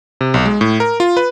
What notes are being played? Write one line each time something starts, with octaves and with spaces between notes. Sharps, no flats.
C3
B1
G#3
A2
A#4
F4
B4